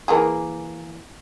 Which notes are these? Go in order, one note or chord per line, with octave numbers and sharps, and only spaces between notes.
E3 A#3 G#4